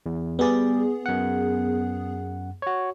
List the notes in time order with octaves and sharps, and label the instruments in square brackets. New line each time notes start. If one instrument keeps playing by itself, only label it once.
[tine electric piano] E2
[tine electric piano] G3 D5 [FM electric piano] B3 G#4
[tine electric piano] F#2 F#5
F#4 C#5